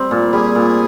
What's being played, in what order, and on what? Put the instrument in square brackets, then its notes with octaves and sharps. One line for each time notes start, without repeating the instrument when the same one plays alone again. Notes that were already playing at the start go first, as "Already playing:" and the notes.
Already playing: [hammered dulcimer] G3 C4
A#2
[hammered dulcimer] G3 [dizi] G#4
[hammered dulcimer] A#2